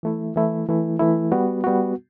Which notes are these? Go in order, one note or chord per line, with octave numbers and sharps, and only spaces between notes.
E3 A3 E4
E3 A3 E4
E3 A3 E4
E3 A3 E4
G3 B3 F#4
G3 B3 F#4